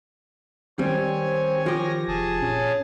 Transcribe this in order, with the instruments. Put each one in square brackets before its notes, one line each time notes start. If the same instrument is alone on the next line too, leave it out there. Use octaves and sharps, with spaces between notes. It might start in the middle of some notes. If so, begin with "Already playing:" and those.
[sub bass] D#3 [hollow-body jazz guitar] G3 [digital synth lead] C4 [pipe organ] C#5 G#5
[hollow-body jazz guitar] F3 G4 [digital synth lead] A#6
[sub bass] F1 [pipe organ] G#4 G#5 A5
[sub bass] A#2 [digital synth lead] C#4